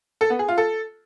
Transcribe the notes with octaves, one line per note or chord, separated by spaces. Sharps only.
A4
B3
G#4
F4
A4